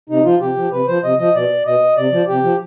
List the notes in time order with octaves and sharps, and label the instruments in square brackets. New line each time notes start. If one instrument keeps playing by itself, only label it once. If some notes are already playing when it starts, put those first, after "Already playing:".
[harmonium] C3 D#4
F3 F4
C3 G4
F3
C3 B4
F3 C5
C3 D#5
F3 D#5
B2 D5
B2 D#5
C3 D5
F3
C3 G4
F3